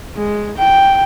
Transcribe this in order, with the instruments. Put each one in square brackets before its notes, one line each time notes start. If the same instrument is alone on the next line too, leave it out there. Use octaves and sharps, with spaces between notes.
[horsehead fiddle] G#3
G5